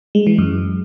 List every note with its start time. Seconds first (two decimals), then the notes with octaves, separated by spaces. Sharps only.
0.15 G#3
0.27 E3
0.38 F#2